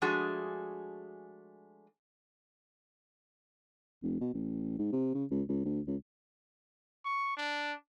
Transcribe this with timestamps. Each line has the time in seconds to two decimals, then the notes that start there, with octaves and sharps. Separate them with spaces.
0.02 F3 G#3 A3 D4 F#4 G#4
4.03 F1
4.21 B2
4.33 A1
4.78 G#2
4.92 C3
5.14 C#3
5.30 C#2
5.49 C#2
5.65 D2
5.87 C#2
7.05 C#6
7.37 D4